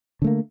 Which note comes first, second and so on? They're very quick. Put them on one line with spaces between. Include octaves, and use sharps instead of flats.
D3 A3 A#3